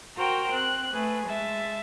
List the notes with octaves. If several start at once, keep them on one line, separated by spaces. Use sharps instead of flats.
F#4 A#4 C5 G5 A#5
C4 F#6
A3 G#4 B4
G#3 E5 A5